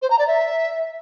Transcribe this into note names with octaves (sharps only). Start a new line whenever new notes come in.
C5
A#5
D5
E5